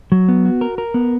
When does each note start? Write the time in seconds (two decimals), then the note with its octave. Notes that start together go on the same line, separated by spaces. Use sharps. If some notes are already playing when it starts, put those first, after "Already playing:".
0.12 F#3
0.29 B3
0.45 F#4
0.61 A#4
0.78 A#4
0.94 B3